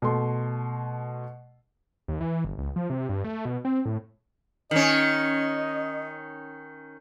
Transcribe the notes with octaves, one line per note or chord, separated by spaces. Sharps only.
B2 A3 C6
D#2
E3
G1
C#2
F3
C3
G2
A3
B2
C4
A2
D#3 C#4 D#5